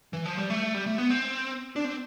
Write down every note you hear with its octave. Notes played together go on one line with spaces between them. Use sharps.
E3
F3
G3
A3
G3
A3
B3
C4
D4
C4